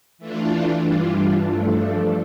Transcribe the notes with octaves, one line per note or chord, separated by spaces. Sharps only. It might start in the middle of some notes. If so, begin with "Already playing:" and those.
E3 A3 D4 F4
G2 E3 G3 D4 F4
G2 F3 A3 D4 A4